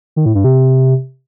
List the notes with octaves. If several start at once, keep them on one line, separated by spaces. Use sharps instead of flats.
D#3
A2
G2
C3